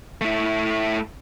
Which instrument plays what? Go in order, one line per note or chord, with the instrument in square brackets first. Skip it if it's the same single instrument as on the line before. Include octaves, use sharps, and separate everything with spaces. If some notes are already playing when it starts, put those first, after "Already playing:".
[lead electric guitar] A3 E4